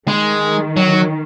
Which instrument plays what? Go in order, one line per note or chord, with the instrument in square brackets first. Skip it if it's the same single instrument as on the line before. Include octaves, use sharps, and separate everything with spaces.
[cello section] D#3 [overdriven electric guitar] G#3
[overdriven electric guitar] F#3